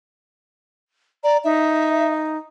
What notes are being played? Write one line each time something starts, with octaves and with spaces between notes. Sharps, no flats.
D5 A#5
D#4 E5